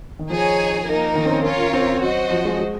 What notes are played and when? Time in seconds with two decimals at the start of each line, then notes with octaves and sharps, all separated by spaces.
0.19 D#3
0.30 F3 D#4 G#4 C#5 G#5
0.87 A#3 D#4 A#4
1.15 D#3
1.25 C4
1.30 C#4
1.44 C#4 F4 A#4 C#5
1.59 C#4
1.73 C4
2.01 F#3 F#4 C5 D#5
2.31 F3
2.45 G#3
2.59 G#3